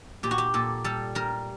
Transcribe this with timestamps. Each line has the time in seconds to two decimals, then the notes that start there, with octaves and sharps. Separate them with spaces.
0.23 A#2 G4
0.31 F#4
0.38 G4
0.54 A#2 A4
0.84 G3 A4
1.15 G3 A#4